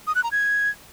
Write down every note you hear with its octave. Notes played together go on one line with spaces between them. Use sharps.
D#6
F#6
A#5
G#6